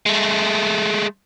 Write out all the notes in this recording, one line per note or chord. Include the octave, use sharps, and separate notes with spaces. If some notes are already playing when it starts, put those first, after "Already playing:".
G#3 A3